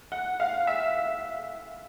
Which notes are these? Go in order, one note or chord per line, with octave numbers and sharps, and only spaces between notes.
F#5
F5
E5